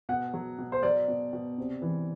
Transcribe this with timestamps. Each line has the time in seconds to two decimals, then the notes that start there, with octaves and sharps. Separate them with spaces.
0.09 B2 F#5
0.34 F#3
0.58 B2
0.72 C5
0.83 F#3 D5
1.08 B2
1.33 B2
1.58 C3
1.82 E3